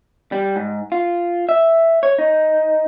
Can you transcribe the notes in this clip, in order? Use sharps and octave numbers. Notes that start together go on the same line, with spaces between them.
G3
G#2
F4
E5
C#5
D#4